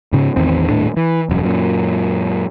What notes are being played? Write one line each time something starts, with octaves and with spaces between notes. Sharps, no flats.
G#2 C#3
A1 E2 D#3 C4
D#1 A2 D4
E3
E1 F#2
F#2 A#2